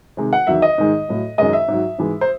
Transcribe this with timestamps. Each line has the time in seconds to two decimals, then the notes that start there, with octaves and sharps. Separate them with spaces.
0.17 C3 D#3 G#3
0.33 F#5
0.47 E2 D#3 F#3 E5
0.62 D#5
0.78 G#2 D#3 G#3
1.08 A2 F#3
1.38 F#2 D#3 G#3 D#5
1.53 E5
1.68 G#2 F#3
1.98 G#2 E3 G#3
2.21 C5